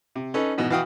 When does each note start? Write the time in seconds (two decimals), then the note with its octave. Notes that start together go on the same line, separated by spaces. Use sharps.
0.16 C3
0.34 C#4 D#4 A4 B4
0.58 G#2 B2 E3
0.70 E3 F#4 F5 G5 D#6